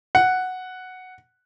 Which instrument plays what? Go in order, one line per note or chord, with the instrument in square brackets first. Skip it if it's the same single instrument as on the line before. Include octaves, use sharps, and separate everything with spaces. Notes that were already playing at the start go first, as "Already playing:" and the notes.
[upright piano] F#5